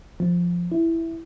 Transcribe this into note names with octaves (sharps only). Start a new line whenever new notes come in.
F3
E4